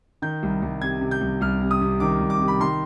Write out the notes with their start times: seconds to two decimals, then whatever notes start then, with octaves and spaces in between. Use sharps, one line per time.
0.22 D#3 G6
0.43 C2
0.62 C2
0.82 C3 G#6
1.01 C3
1.11 G6
1.21 C2
1.41 C2 F6
1.61 C3
1.71 D#6
1.81 C3
2.00 D#3 D6
2.20 C2
2.30 D6
2.40 C3
2.48 B5
2.60 D#3 C6